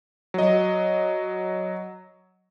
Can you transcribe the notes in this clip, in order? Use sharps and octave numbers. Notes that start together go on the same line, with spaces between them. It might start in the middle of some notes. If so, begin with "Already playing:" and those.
F#3 D#5